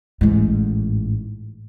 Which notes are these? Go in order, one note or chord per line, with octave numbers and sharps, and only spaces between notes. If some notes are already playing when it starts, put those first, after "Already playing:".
A1 G#2